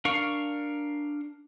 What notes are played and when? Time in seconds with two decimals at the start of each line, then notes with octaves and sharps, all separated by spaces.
0.05 D4 A#4 F5 C#6